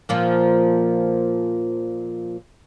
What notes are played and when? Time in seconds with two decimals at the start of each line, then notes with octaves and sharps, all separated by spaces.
0.09 A#2 F3 A#3